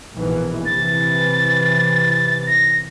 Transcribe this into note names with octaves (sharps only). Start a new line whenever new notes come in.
A#1 B2 E3
C3 E3 A6
A#6